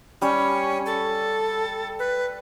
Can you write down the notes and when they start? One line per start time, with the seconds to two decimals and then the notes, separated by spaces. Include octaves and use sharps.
0.22 G3 C#4
0.86 A4
1.99 B4